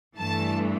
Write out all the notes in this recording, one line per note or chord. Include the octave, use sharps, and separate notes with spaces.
G2 E3 A3 A5